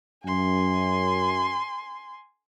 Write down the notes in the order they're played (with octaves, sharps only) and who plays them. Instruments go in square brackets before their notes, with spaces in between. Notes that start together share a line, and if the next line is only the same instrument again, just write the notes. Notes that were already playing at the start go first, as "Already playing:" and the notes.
[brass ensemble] F#2 [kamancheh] G#5 C6